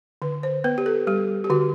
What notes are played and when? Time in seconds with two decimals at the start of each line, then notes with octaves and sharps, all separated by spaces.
0.22 D3 B4
0.43 C5
0.64 B3 B4
0.78 G4
0.86 A4
1.07 G3 G4
1.44 G4
1.50 D3 F#4